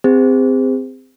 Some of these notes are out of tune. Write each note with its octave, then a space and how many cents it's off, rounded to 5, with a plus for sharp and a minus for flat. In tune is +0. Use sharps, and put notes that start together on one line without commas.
C4 -20 G#4 -40 C5 -35